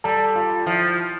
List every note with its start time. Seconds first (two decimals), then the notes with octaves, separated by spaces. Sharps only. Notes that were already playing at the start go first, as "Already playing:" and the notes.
0.04 G3 A4
0.35 F4
0.66 F3 E4